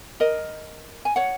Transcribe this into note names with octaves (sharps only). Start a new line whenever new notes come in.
A#4 D#5
G#5
C#5 F#5